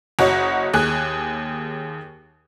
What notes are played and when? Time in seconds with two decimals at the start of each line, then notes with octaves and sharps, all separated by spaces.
0.19 F#1 F#4 C#5 D#5
0.74 D#2 G#4 F#6